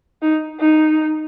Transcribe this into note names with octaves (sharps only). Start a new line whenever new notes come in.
D#4
D#4